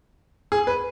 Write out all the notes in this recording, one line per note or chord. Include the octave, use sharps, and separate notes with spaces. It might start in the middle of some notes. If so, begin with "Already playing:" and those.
G#4
B4